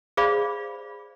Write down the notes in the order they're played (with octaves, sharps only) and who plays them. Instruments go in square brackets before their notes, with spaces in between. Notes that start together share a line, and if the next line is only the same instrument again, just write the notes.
[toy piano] G#4 C5 D5 F5 B5